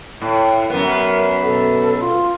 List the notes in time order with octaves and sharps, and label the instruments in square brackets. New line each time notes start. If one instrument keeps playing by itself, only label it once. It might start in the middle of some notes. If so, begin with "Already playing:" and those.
[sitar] A2
[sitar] F#2 B3 [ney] A#4
[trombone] B2 [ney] A4
[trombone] F4 [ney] C6